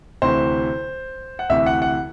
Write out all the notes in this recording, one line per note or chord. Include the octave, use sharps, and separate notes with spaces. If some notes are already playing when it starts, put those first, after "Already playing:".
D2 C3 E3 C5
F#5
D2 C3 E3 E5
F#5
F#5